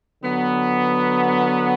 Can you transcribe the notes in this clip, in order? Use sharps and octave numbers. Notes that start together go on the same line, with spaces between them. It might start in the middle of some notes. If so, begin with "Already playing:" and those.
D3 F#3 B3